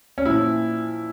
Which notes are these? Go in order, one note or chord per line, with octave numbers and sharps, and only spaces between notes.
C#4
A#2 F3 E4